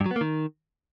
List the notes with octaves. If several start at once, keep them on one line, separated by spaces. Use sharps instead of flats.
G2
F#3
B3
A#3
D#3